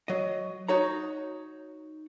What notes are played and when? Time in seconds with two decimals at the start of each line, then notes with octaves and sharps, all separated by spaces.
0.08 F#3 D#5
0.68 D#4 F#4 C#5 A#5